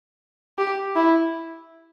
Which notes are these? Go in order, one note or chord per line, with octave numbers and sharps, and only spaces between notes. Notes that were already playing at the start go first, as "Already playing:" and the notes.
G4
E4